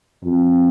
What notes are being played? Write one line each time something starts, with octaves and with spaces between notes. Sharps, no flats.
F2